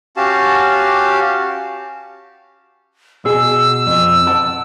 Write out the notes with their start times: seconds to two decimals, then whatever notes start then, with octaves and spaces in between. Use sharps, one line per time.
0.17 C#4 F#4 G4 F5 A5
3.25 B2 G#4 E6
3.87 F2
4.27 F#5 A5